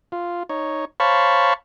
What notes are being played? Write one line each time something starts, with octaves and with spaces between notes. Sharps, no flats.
F4
D#4 C#5
C5 C#5 F5 A5 B5 C#6